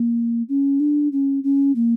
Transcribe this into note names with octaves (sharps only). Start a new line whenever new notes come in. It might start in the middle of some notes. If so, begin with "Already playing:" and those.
Already playing: A#3
C#4
D4
C#4
C#4
A#3